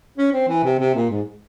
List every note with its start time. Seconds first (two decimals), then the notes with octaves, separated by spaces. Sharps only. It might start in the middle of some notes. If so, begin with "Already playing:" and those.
0.18 C#4
0.33 C4
0.48 E3
0.64 C3
0.79 C3
0.95 A#2
1.10 G#2